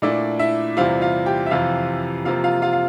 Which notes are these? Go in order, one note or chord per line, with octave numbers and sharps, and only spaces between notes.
A#2 A3 D4 E4 D5
E4 E5
E2 C3 G3 C4 E4 F4 F5
F4 F5
G4 G5
E5
F2 C3 E3 F4 F5
C3 F3 A#3 F4 F5
F4 F5
F4 F5
F5